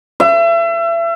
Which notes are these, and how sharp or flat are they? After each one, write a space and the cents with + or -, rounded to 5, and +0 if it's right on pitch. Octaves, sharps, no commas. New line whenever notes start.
E5 +35